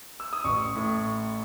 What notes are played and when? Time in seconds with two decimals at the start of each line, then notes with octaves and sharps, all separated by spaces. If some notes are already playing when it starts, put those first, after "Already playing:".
0.20 E6
0.33 D#6
0.44 A1 C#6
0.75 A2